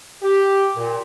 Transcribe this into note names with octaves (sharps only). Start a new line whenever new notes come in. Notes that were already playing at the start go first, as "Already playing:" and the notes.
G4
A#2